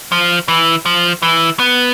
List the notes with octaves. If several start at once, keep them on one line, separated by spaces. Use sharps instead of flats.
F3
E3
F3
E3
B3